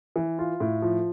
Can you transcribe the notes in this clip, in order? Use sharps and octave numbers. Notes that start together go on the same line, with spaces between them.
E3
F4
A2
F3